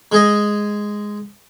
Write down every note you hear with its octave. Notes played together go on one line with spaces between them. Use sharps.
G#3 G#4 D#5